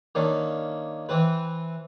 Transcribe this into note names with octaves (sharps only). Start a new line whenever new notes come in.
D#3 A#3 C#4 D4
E3 C4 B4